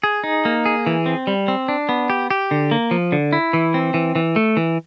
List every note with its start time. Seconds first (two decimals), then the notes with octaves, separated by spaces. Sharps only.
0.04 G#4
0.24 D#4
0.45 A#3
0.66 G#4
0.86 E3
1.06 C4
1.27 G3
1.48 C4
1.68 D4
1.89 B3
2.10 G4
2.31 G4
2.51 D3
2.71 A#3
2.91 F3
3.12 D3
3.33 E4
3.53 E3
3.74 C4
3.94 E3
4.15 E3
4.36 A3
4.57 E3